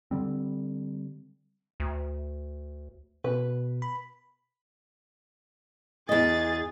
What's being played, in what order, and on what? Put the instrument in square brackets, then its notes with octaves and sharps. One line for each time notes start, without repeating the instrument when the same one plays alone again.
[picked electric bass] D3 G3 C4
[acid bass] D2
[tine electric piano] B2 [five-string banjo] B4
[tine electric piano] B5
[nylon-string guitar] E2 D#5 [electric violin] G#4 A6